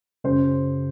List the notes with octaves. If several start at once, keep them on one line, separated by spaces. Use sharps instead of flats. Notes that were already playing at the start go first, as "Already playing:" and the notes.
F#2 C#3 C5